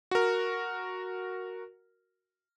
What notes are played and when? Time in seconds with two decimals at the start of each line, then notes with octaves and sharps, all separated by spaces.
0.11 F#4 A#4